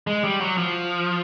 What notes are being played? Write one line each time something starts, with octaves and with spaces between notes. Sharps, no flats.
G#3
G3
F#3
F3